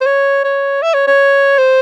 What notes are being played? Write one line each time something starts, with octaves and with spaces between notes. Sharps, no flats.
C5
C#5
C#5
E5
C#5
C#5
C5